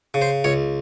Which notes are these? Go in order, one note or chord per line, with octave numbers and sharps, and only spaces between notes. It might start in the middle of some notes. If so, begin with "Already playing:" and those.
C#3
C5
C#2 C#5